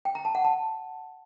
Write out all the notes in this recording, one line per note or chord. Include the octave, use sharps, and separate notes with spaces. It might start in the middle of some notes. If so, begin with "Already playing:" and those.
G5
A#5
A5
F#5
A5